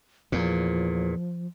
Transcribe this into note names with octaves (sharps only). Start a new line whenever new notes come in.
E2 A#2 F3